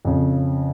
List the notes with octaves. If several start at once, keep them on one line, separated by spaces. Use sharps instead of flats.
F2 C#3